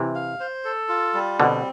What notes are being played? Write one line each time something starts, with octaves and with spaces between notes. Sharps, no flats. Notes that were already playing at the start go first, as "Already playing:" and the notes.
Already playing: C3 E3
F5
C5
A4
F4
G3
B2 D3 C4